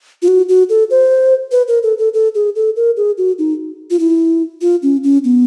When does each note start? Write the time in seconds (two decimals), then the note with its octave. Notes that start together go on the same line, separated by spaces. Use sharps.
0.22 F4
0.28 F#4
0.49 F#4
0.69 A4
0.90 C5
1.52 B4
1.68 A#4
1.83 A4
1.98 A4
2.14 A4
2.35 G#4
2.56 A4
2.76 A#4
2.97 G#4
3.18 F#4
3.38 D#4
3.90 F4
3.99 E4
4.61 F4
4.83 C#4
5.03 C#4
5.24 B3